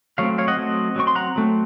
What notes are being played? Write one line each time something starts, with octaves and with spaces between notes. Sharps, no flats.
F#3 A3 C4 C#5 F5
C#5 F5
D#5 F#5
F#3 A3 C4
F#3 A3 C4 C#6
C6
F#5 A#5
F#3 A3 C4